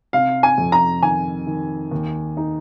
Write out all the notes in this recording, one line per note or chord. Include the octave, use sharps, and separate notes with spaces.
C3 F5
G#5
F2
A#5
D#3 G#5
D#3
D#2
D#4